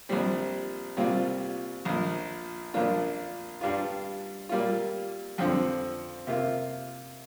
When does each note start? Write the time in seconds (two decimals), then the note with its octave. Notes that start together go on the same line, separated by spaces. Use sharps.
0.09 A#1 A#2 G3 C4
0.97 C2 A#2 G3 C4 F4
1.85 A#1 A#2 F3
2.74 A#1 A#2 A#3 D4 F4
3.61 G2 G3 D4 F4
4.49 A#2 G3 A#3 F4
5.38 F2 D3 F3 C4
6.27 C3 A#3 F4